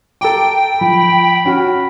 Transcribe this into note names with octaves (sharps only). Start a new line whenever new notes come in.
A4 G5 A#5 D6
F3 B5
C#4 F#4 F6